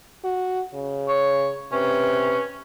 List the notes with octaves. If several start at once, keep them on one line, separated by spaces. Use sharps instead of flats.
F#4
C#3
C#5
C3 C#4 B4